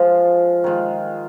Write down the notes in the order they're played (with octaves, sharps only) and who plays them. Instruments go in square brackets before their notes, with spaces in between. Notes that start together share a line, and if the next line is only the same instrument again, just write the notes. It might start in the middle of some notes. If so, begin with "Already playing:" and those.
Already playing: [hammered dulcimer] F3 G#3 F4
D#3 G#3 F4